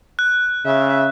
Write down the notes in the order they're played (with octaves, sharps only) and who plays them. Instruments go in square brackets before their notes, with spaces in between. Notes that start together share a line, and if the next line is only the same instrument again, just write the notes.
[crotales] F#6
[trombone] C#3 [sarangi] E5